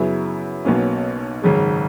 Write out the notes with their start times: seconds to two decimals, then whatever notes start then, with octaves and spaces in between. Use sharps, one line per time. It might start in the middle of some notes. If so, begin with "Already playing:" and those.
Already playing: F#2 C#3 F#3 B3 E4
0.65 B1 B2 A#3 C#4
1.42 G#1 F#2 C#3 G#3